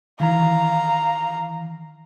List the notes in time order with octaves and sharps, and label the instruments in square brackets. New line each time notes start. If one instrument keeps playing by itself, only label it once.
[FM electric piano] D#3 E3 [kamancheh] F5 A#5